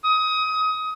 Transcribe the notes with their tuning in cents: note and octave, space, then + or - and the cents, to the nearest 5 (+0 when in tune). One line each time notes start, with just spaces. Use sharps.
D#6 +25